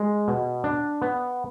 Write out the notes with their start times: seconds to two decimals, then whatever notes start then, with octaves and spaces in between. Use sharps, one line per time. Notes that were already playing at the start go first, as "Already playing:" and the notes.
Already playing: G#3
0.28 B2
0.64 D4
1.02 B3